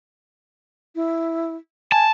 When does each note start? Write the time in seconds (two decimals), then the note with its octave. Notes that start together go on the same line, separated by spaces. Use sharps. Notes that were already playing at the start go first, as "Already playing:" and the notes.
0.95 E4
1.92 G#5 A5